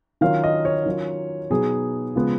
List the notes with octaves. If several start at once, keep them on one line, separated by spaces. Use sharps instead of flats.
D#3 F#3 C#4 F4 F5
D#5
C#5
D#3 F#3 C#4 F4
B2 F#3 B3 D#4 G#4
C#3 F3 G#3 B3